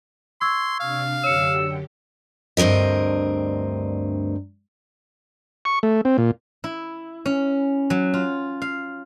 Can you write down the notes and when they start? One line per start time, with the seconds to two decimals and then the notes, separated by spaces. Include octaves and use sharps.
0.41 C6 C#6 E6 G#6
0.80 C3 D4 F5
1.24 F#2 D3 G4 C#5 E6 C#7
2.57 D2 G2 C4 A#4 D#5
5.65 C#6
5.83 A3
6.05 C4
6.18 A#2
6.64 E4
7.26 C#4
7.90 F#3
8.14 F4
8.62 F5